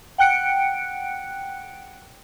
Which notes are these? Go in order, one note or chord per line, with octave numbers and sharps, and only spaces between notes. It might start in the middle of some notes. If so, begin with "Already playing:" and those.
F#5 G5 F#6 C#7 D7